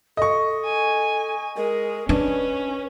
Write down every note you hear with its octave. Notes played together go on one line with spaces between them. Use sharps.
A4 D#5 C#6
G#5
G#3 A#4
C#4 D4 B4